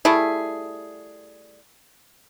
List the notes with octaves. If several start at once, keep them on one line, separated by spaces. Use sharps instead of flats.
G3 A3 E4 G#4